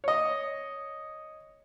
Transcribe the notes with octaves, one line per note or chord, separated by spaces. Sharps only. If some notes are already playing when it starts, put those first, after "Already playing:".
C#5 D#5